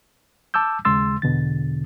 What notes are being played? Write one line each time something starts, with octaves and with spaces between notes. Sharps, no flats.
A5 D6 E6 G6
D#2 C#3 G#3 C6 E6 A6
E2 B2 D3 A6